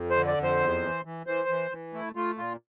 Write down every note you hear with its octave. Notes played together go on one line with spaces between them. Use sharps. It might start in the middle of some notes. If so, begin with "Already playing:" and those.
Already playing: F2
C5
D3
D5
F2
C5
E2
E3
E3
E3 C5
E3
E3
A3 E4
A3 F4
A#2 F4